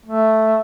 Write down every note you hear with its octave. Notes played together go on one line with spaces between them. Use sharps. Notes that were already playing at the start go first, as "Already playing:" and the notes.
A3